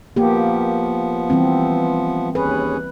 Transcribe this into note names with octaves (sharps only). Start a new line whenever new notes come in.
F3 A#3 B3 G4
E3 G3 C4
D#2 C#4 G#4 B4